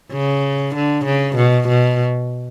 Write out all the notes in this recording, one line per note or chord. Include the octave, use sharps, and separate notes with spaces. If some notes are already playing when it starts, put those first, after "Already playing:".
C#3
D3
C#3
B2
B2